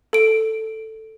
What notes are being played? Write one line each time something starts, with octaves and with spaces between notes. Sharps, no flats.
A4 D7